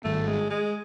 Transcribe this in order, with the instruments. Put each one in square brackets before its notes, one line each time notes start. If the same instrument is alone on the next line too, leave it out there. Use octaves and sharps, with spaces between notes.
[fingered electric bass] G#1 G#2 D#3 G3 [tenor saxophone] A3
[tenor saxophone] G#3
G#3